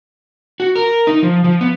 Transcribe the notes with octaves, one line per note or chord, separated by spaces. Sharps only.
F#4
A#4
D#4
F3
F3
B3